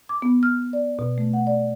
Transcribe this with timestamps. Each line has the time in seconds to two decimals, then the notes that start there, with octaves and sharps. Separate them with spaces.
0.09 D6
0.22 B3
0.43 F6
0.73 D5
0.99 B2
1.18 A3
1.33 F#5
1.47 D5